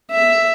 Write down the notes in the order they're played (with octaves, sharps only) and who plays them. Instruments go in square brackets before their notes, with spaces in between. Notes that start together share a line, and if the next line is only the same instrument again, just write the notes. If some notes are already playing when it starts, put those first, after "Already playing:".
[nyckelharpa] E5